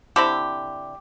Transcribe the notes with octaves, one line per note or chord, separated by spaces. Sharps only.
D3 C4 E4 G4